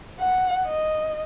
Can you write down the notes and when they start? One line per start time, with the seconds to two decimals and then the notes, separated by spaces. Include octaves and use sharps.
0.20 F#5
0.67 D#5